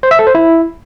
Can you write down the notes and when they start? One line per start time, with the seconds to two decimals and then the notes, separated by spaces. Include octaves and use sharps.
0.03 C5
0.11 E5
0.19 A4
0.27 C5
0.35 E4